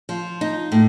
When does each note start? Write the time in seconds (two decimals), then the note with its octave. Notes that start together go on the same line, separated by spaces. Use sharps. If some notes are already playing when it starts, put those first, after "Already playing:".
0.09 F3
0.41 D#4
0.72 A2